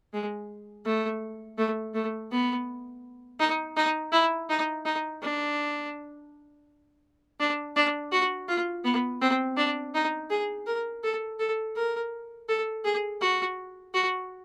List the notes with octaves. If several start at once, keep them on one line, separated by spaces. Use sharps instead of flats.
G#3
A3
A3
A3
B3
D#4
D#4
E4
D#4
D#4
D4
D4
D4
F#4
F4
B3
C4
D4
D#4
G#4
A#4
A4
A4
A#4
A4
G#4
F#4
F#4